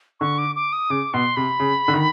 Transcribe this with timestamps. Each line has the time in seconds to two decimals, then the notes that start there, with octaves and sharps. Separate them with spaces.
0.20 D3 C#6
0.38 D6
0.56 D6
0.73 D#6
0.90 C#3 D6
1.14 B2 C6
1.36 C3 B5
1.60 C#3
1.88 D3
1.94 D#3